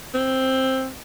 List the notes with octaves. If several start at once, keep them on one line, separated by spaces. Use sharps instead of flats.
C4